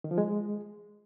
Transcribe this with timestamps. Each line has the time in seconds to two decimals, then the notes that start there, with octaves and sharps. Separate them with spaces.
0.04 D#3
0.11 F3
0.18 G#3